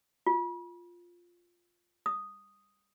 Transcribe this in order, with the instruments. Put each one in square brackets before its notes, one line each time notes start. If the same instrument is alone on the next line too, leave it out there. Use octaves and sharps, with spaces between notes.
[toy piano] F4
D#6